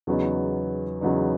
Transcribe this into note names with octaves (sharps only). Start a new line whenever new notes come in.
E2 C#3 F#3 B3 D#4
E2 C#3 F#3 B3 D#4